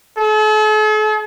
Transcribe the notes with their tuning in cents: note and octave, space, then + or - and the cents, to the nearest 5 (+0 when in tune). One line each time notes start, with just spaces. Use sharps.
A4 -45